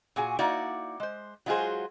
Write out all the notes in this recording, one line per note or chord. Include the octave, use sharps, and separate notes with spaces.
A#2 F#4 G#4 G#5
A#3 D#4 E4 F#4 D5 A#5
G#3 C5
F#3 G#3 F4 F#4 G#4 C5